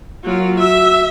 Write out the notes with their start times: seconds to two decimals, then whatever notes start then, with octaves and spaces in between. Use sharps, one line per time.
0.24 F#3 A#3 F4
0.60 F#4 E5 E6